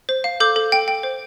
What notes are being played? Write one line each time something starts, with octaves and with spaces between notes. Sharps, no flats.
C5
F5
A4 D6 G6
A4
G5
G5
C5